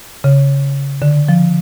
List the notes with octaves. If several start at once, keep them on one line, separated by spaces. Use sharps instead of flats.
C#3
D3
F3